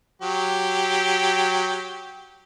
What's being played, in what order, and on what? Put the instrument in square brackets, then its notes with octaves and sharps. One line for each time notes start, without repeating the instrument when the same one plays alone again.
[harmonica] F#3 G4